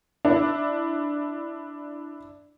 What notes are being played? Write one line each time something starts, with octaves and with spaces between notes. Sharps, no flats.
D4 E4